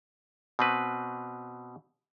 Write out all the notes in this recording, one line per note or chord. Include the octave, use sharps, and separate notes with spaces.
B2 C4 B4